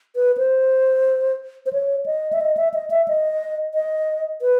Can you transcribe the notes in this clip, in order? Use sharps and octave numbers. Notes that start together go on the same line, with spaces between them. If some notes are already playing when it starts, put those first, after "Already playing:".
B4
C5
C5
C#5
D#5
E5
D#5
E5
D#5
E5
D#5
D#5
B4